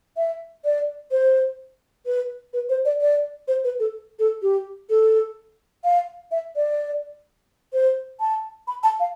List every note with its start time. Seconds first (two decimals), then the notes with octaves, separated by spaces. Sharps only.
0.17 E5
0.65 D5
1.11 C5
2.06 B4
2.53 B4
2.69 C5
2.85 D5
3.01 D5
3.48 C5
3.64 B4
3.79 A4
4.19 A4
4.42 G4
4.90 A4
5.84 F5
6.31 E5
6.56 D5
7.73 C5
8.20 A5
8.67 B5
8.83 A5
9.00 F5